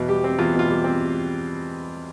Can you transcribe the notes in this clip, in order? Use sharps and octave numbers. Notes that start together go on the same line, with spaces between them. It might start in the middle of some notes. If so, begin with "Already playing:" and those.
Already playing: E2 B2
G3 G4
C4
E2 F4
B2
F4
G3
C4